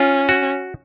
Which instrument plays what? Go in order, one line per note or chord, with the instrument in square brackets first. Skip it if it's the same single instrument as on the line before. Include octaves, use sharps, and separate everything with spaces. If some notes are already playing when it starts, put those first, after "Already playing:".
Already playing: [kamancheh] C#4 [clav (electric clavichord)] F4
[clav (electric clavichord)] F#4